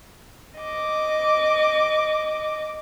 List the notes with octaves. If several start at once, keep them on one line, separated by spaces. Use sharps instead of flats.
D#5 D6